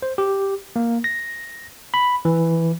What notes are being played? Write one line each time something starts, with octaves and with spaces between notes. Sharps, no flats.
C5
G4
A#3
A#6
B5
E3